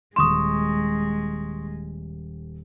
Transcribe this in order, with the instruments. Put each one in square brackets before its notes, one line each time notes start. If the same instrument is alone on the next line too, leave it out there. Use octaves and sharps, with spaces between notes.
[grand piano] D#1 E7 [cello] G#3 [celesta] C6 C#6 D#6